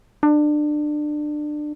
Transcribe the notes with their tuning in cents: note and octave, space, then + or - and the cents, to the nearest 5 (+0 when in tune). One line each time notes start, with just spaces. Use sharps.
D4 +25